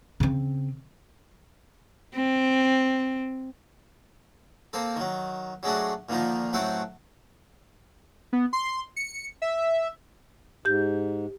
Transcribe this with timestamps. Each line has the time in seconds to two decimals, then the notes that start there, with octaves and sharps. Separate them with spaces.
0.20 C#3 C4
2.16 C4
4.73 A#3 C4 A4
4.96 D#3 F#3
5.63 F#3 G#3 A3 D4 F#4
6.09 A#2 D3 D#3 F3 D#4
6.53 A1 F#3 A3 C4 F#5 G5
8.33 B3
8.53 C6
8.96 C#7
9.42 E5
10.65 G#2 G4 G6